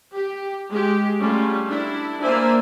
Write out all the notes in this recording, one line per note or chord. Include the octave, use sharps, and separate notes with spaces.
G4
G#3 G4
G3 A3 C#4 F4
D4 E4
A#3 C5 D5 E5 G#5